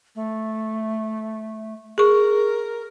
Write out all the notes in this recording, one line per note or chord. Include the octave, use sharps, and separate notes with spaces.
A3
G#4 A#4 C#6